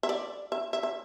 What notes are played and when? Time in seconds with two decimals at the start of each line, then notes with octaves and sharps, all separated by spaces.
0.03 E5
0.09 D5
0.52 E5
0.73 E5
0.83 E5